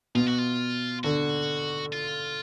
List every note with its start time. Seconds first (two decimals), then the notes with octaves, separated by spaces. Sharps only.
0.15 B2 F4
0.27 F#4
0.39 F4
1.04 D3 F#4
1.93 F4